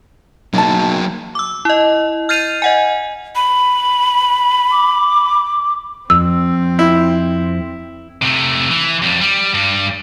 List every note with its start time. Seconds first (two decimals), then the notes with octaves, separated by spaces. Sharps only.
0.54 B1 F#3 A#3 A5
1.35 D6 E6
1.65 E4 D#5
2.29 F6 G6 A6 C7 D#7 F7
2.62 D#5 F#5 G#5
3.36 B5
4.71 D6
6.10 F2 C4 E6
6.79 E4
8.22 C3 A3
8.70 E3
9.02 F2 G3
9.21 G3
9.54 G2 G3